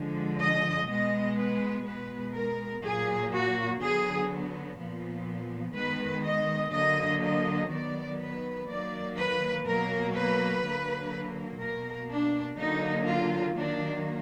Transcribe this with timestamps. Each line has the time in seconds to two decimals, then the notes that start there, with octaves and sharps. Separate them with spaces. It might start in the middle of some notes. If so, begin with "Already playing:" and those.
Already playing: D3 F3 G#3
0.39 D#5
0.88 B2 G#3 B3 D#5
1.36 B4
1.85 B2 G#3 B3 B4
2.34 A#4
2.82 A#2 F#3 A#3 G#4
3.32 F#4
3.80 D3 F#3 B3 G#4
4.78 A#2 F3 B3
5.75 D#3 G#3 B3 B4
6.24 D#5
6.72 D3 F#3 A#3 D#5
7.22 D#5
7.69 D#3 F#3 B3 D5
8.19 B4
8.67 D#3 F#3 A#3 D5
9.16 B4
9.65 B2 F#3 A#3 A#4
10.13 B4
10.63 D3 F#3 A#3
11.59 B2 A#3 A#4
12.09 D4
12.57 D3 F#3 A#3 D#4
13.06 F4
13.55 D#3 F#3 A#3 D4